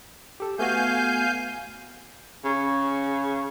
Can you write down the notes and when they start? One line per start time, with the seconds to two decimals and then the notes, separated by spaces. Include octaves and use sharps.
0.40 G4 A4
0.59 A3 B3 F#4 F5 G#5 G6
2.44 C#3